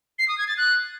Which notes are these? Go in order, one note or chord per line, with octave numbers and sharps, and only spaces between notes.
C7
D#6
G#6
A6
F#6